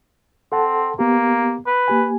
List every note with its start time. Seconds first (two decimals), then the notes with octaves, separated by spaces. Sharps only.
0.52 C4 A4 F#5 A5
0.99 A#3 B3 G4
1.67 B4
1.88 A#3 G4 G#5